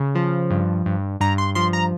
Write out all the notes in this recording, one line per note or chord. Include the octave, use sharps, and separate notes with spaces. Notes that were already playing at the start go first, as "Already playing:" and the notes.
Already playing: C#3
F3
G2
G2
G2 A#5
C6
F3 C6
A#5